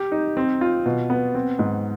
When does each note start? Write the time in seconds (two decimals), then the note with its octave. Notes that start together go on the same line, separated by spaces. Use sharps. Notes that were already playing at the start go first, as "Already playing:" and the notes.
Already playing: G4
0.12 D#4
0.37 C4
0.61 F4
0.85 B2
1.10 B3
1.35 C4
1.59 G#2